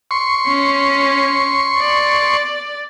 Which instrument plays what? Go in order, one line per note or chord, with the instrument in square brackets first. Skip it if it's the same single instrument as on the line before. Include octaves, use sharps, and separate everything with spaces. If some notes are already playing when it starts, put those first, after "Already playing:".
[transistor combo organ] C6 C#6
[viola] C#4
D5